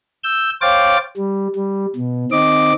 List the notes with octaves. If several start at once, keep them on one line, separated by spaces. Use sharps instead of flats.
E6 G6
C5 C#5 F5 G5 D6 A6
G3
G3
B2
D#3 C4 D#5 D6